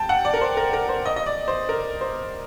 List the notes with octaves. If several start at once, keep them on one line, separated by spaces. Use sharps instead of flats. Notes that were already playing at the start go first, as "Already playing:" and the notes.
Already playing: G5 A5
F#5
D5
A#4
C5
A#4
A#4
C5
D#5
D#5
D5
C5
A#4
C5